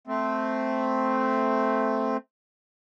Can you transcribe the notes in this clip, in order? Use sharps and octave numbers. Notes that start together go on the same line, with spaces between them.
A3 C4